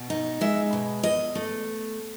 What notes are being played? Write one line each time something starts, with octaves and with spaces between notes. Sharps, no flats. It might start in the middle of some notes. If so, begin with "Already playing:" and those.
Already playing: B2
D#4
G#3 E5
B2
E2 D#5
A3